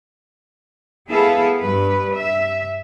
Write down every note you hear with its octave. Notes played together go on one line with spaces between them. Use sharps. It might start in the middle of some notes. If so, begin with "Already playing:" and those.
B3 E4 G#4 A4 F5
G2 B4
E5